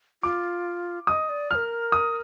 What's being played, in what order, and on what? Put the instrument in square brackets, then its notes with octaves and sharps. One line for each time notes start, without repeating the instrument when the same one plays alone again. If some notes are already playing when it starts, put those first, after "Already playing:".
[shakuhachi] F4 [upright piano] D6
[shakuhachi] D#5 [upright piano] D#6
[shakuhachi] D5
[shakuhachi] A#4 D5 [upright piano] F6
[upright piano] D#6